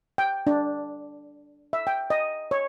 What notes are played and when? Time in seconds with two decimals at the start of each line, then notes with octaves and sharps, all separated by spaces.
0.18 G5
0.47 D4
1.73 E5
1.87 G5
2.10 D#5
2.51 C#5